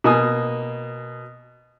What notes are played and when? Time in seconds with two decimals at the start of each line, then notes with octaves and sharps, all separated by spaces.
0.04 B2 A#3 G#5 D#6